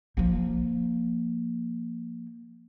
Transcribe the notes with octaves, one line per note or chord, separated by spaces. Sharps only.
F3 A#3